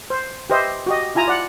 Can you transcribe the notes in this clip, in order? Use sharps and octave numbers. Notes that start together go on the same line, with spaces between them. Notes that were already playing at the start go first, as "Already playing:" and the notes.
C5
G4 B4 C5 D#5 E5
F#4 G4 D#5
E4 F4 G#5 A#5
D5 F#5